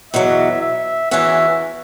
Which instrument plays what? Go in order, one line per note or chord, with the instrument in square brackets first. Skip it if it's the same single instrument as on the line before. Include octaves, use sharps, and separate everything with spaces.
[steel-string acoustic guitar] E2 B2 F#3 [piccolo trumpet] E5
[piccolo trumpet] E5
[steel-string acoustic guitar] E2 E3 C#4 F#4 [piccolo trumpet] E5